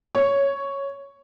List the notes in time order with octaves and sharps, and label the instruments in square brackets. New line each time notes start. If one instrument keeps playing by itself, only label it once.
[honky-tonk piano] C#5